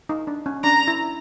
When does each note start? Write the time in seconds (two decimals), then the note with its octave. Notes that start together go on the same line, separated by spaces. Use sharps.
0.09 D#4
0.27 D4
0.46 C#4
0.64 D4 A#5
0.88 E4